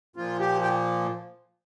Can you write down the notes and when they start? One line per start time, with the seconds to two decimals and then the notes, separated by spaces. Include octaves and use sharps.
0.16 A#2 F3 A#3 F4
0.40 G4
0.62 G4